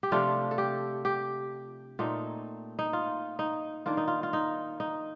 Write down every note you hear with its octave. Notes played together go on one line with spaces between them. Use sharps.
G4
C3 F3 A3 D4 F4
A4
G4
G4
A#2 A3 C4 D#4
D#4
F4
D#4
D#3 A#3 D4 F4
D#4
F4
F4
D#4
D#4